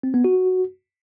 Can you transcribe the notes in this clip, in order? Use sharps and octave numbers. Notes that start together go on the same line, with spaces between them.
C4
B3
F#4